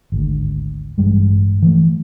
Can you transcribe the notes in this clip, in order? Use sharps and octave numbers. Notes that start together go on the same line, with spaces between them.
G#1 D2
A1 G2 G3 G#3
E3 F3 A3